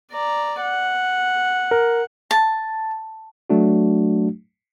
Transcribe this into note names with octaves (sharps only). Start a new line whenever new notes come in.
D5 A#5
F#5
A#4
A5
F#3 A3 D4 F#4